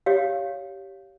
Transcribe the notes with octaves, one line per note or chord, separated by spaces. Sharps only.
G4 C#5 F5